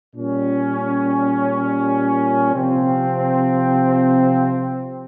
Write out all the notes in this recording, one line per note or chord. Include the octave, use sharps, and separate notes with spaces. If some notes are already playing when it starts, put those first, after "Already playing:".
A#2 G3 C#4
C3 F3 C4